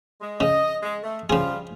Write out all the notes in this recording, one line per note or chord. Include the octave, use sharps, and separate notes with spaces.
G#3
C#3 D#5
G#3
A3
C#3 F3 G3 F4 G#4